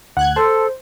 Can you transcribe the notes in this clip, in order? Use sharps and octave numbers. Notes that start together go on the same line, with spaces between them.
D2 F#5 F#6 G#6
A4 C5 A5 C6